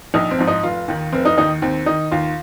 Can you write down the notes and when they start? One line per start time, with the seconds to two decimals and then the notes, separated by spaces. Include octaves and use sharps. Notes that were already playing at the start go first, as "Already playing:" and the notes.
0.14 A#1 D#4
0.31 C4
0.38 G#2 F3
0.47 D#4
0.63 F1 F4
0.88 D#2 D#3
1.12 F1 C4
1.25 D#4
1.37 D#2 D#3 D#4
1.62 D#2 C4
1.86 D#3 D#4
2.12 D#2 F4